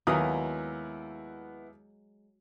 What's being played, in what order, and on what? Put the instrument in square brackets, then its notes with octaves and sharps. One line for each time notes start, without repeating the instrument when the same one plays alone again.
[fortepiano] D#2 A#4 D#6 [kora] F#3 G#3 [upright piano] B3 E4